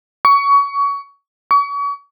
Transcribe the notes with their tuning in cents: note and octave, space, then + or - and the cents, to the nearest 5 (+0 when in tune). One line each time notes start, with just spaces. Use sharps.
C#6 +25
C#6 +40